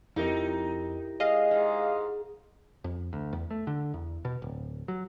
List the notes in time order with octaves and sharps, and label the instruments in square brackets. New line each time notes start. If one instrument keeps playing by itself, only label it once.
[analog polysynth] F2 [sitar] D#4 [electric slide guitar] E4 G4 A#4
[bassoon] G#3 [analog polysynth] D#5 F5
[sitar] G#2
[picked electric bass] F2
D2
E2
A3
D3
E2
B2
D1
F#3